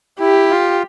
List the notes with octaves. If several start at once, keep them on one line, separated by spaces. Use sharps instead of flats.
E4 G4
F4